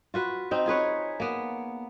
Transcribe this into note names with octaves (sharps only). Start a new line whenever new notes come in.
F4 F#4 B4
C4 D#4
F4 G#4 B4 C#5
A#3 B3